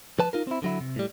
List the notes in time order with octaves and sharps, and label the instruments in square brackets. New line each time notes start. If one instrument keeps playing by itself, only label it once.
[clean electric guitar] F3 B4 A5
D#4 F4 A#4
C4 E4
D3 F#3 E4
C3
A2 G3